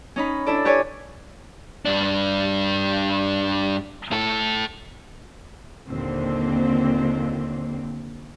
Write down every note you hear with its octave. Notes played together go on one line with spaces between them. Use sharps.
C#4 D#4 B5
D4 E4 A4 D5
G4 B4 C#5 D5 G#5
G2 D4
A2 A4
D#2 A#2 D3 C4